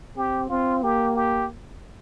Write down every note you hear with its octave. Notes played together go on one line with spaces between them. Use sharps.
C4 G4
C4 F4
A#3 G4
G4